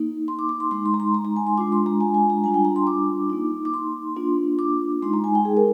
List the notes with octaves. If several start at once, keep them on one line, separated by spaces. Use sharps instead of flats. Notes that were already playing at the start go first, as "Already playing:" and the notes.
Already playing: A#3 D#4
C6
D6
D6
C6
G#3 D#4 C6
C6
A#5
C6
A#5
A#5
G#5
C6
G#3 D4 F4 D6
C6
A#5
G#5
G#5
A#5
G3 D4 F4 G#5
G5
A#5
C6
D6
A#3 D#4
D6
C6
A#3 D4 F4
D6
G#3 D#4 C6
A#5
G#5
G5
G#4
A#4